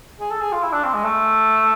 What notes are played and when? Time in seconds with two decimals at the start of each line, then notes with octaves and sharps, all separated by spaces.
0.20 G#4
0.31 A4
0.42 G#4
0.52 F4
0.62 E4
0.73 D4
0.84 C4
0.94 G#3
1.04 A3